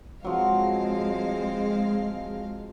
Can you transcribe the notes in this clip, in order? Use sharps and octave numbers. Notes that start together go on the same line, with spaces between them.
F3 F#3 G#3 C4 F5